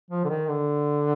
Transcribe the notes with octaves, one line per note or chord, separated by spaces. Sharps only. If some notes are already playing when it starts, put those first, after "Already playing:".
F3
D3
D#3
D3